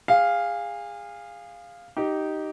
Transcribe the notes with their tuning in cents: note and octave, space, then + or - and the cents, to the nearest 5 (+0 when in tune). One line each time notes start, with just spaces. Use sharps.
G#4 -30 F5 +0
D#4 +0 G4 -15